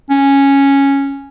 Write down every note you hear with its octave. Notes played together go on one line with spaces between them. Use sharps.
C#4